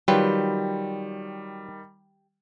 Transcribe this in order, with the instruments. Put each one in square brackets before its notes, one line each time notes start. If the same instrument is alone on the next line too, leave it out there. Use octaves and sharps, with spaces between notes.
[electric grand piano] D#3 G3 [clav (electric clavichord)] F#3 F4 B4 [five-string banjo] G4